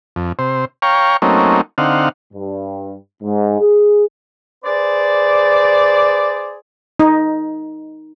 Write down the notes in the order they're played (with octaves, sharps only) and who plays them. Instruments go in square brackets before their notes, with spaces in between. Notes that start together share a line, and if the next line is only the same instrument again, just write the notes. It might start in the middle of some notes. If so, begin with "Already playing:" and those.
[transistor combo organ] F2
C3 C5
C#5 F5 G5 A#5 C#6
F#3 A3 A#3 C4 C#4 D#4
D3 C4 D#4 F5 F#5
[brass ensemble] G2
G#2
G#4
[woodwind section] G#4 B4 C5 D5
[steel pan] D#4